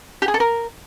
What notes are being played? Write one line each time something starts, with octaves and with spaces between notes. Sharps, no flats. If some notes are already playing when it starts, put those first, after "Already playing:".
G4
G#4
A4
A#4